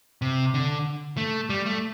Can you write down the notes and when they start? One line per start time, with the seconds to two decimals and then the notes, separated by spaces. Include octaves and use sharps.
0.22 C3
0.54 D3
1.17 A3
1.50 G3
1.66 A3